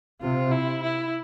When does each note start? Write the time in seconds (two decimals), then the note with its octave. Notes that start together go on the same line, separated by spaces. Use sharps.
0.21 C3 F4
0.51 E4
0.83 E4